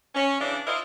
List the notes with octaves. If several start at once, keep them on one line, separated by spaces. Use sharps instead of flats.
C#4
C#3 E3 D4
E4 F4 A#4 C5 D#5